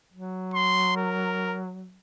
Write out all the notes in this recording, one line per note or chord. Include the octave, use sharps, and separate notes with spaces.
F#3
C6
A#4